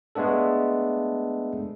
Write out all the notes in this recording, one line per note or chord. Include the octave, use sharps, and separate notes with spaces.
G#3 A3 B3 D4 A4